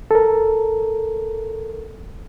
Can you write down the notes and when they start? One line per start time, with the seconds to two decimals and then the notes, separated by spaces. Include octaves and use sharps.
0.11 A4 A#4